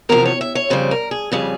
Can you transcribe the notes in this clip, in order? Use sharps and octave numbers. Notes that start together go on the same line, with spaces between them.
E2 C3 F3 A#4
C#5
E5
C#5
F2 C#3 G3 C5
A#4
G#4
F2 C#3 G3 G#4